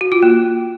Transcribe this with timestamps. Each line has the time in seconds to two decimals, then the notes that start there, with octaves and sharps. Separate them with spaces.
0.01 F#4
0.12 F4
0.23 A#3